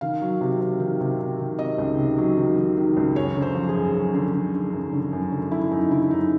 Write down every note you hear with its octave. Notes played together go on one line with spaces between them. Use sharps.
D#3 F5
F#3
C3
C3
D#3
C3
C3
D#3
C3 D#5
C#2
C3
F#3
D#3
D#3
D#3
C#2
F#2 C#5
D3
C5
F3
G#4
F#2
F#2
D3
D3
D3
F#2
D3
F#2
D3
D3 E4
F#2 D#4
D3 E4
F#2 D#4